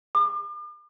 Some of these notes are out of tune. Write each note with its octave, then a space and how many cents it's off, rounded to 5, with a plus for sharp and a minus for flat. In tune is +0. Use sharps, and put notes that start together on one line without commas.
D6 +40